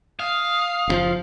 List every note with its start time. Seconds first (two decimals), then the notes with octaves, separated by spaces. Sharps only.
0.20 F5 D#6
0.88 F#1 C#3 F3